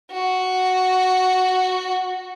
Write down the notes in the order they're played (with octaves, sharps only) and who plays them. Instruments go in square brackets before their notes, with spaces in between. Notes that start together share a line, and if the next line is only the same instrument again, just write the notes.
[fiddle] F#4